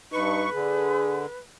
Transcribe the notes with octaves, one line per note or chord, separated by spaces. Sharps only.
G2 D#4 B4 C#6
D3 G#4